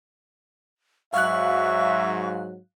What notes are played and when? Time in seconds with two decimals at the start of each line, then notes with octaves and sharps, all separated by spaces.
1.14 G#2 F#3 E5 F5 C#6 F#6